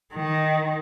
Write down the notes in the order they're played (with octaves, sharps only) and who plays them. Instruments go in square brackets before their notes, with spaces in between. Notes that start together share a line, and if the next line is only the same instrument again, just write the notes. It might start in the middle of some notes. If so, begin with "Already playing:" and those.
[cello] D#3